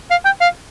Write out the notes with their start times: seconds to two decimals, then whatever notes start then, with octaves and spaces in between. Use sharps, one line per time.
0.10 F5
0.25 G5
0.41 F5